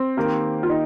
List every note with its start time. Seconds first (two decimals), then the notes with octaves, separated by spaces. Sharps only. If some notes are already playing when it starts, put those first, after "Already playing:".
Already playing: C4
0.17 D#3 A#3 G4
0.63 F4
0.70 D#4